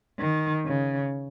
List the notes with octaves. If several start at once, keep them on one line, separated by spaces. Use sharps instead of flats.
D#3
C#3